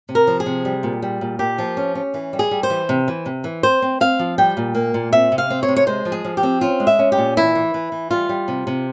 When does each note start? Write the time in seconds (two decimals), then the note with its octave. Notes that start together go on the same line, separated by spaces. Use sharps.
0.09 C3
0.15 A#4
0.27 F3
0.40 G#4
0.46 C3
0.65 G3
0.83 A#2
1.02 G3
1.21 A#2
1.39 A#3 G4
1.58 F3
1.77 C#4
1.95 C#4
2.14 E3
2.33 G3
2.39 G#4
2.51 G3
2.63 C5
2.70 E3
2.89 C3
3.08 E3
3.26 C3
3.44 E3
3.63 C4 C5
3.82 C4
4.00 C4 F5
4.19 F3
4.38 G3 G5
4.57 A#2
4.75 A#3
4.94 A#2
5.12 C4 E5
5.32 C3
5.38 F5
5.50 C4
5.63 C#5
5.68 C3
5.77 C#5
5.87 G#3 C5
6.05 F3
6.12 G#4
6.25 F3
6.37 G4
6.43 C4
6.61 C#4 F4
6.80 G#3
6.87 E5
6.99 C#4
7.12 G4
7.18 A#2
7.37 E3 E4
7.55 E3
7.74 E3
7.92 E3
8.11 G3 F4
8.29 G3
8.48 C3
8.67 C3